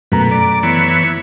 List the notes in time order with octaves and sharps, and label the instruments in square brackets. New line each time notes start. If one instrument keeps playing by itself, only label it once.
[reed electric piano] F#2 A3 A#5 [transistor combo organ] B2
[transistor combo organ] D5
E3 B3 C#5